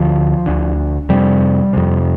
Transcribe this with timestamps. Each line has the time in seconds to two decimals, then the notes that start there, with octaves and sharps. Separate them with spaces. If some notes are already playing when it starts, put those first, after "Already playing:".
Already playing: D2 D3 F3
0.46 D2 D3
1.09 F2 C3 G3
1.73 F2 C3